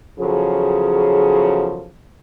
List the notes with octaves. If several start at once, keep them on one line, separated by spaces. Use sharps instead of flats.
E2 C#3 F3 F#3 G#4 A4